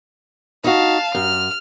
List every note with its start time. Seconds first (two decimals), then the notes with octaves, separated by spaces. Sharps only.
0.64 D#4 F#4 F5 A5
1.15 F#2 F6